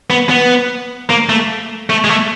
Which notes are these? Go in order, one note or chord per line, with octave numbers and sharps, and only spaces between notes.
B3
B3
A#3
A3
A3
G#3
A3